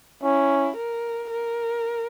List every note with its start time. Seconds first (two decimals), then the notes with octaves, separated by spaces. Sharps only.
0.23 C#4 E4
0.77 A#4
1.31 A#4